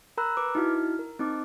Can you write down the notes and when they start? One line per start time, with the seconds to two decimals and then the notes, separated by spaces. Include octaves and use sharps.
0.18 A#4 A#5 B5 E6 F#6
0.37 B4 D6
0.55 D#4 E4 F#4 F6
0.99 A#4
1.19 C4 D#4 D6